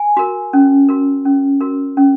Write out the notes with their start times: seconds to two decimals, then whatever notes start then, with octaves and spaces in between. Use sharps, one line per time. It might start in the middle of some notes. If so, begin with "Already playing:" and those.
Already playing: G#5
0.17 F#4 A#4
0.53 C#4
0.89 F#4 A#4
1.25 C#4
1.60 F#4 A#4
1.97 C#4